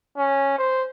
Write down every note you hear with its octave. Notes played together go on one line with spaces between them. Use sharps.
C#4
C5